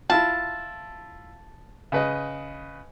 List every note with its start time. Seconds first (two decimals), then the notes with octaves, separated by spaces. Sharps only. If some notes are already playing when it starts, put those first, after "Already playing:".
0.10 E4 F4 A5
1.92 C#3 B4 D#5